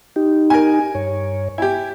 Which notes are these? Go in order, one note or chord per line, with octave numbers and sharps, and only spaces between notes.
D#4 G4
A#4 G#5
G2 C#5
E4 G4 G#5